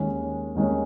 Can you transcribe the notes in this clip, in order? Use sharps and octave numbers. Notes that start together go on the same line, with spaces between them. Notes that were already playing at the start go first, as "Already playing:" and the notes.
Already playing: D#2 D#3 G#3 C#4
D#2 D#3 G#3 C#4